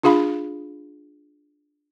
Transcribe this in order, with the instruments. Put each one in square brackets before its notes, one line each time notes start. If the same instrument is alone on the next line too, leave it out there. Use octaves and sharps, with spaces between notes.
[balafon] D4 F4 G#4 F5 B5